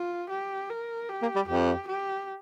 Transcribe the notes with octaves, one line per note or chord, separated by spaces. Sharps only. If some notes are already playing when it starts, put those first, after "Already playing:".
Already playing: F4
G4
A#4
G4
A#3
G3
F2 G4
G4